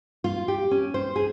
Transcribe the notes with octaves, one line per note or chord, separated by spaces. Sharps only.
F4
G4
C#4
C5
G#4